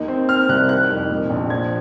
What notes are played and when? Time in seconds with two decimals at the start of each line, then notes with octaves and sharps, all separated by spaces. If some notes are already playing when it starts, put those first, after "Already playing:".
Already playing: D#2 D#4
0.08 C4
0.29 C4 F6
0.49 C2 F#6
0.69 D#3 F#6
0.90 F2
1.09 A#2
1.30 A#1
1.50 F3 G#6